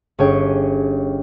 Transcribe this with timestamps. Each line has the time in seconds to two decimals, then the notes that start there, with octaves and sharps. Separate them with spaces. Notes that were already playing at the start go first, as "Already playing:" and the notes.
0.19 G1 C#4 G#4 C#5 G5